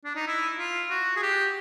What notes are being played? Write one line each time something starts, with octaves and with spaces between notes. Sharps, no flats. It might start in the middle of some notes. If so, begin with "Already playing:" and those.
D4
D#4
E4
F4
F#4
G#4
G4